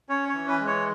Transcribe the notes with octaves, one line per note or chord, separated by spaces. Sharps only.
C#4 C#5
C#5
E3
B4
G#3
C#5